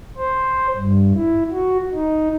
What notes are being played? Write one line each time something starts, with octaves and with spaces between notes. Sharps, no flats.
C5
G2
E4
F#4
D#4